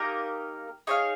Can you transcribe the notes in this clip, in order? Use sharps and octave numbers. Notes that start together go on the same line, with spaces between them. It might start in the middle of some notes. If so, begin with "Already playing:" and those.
Already playing: A#3 D#4 G4 A#4
D#4 G#4 C#5 F5